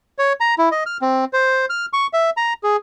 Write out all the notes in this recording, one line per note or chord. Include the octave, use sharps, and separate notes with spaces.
C#5
A#5
E4
D#5
F6
C4
C5
F6
C#6
E5
A#5
G#4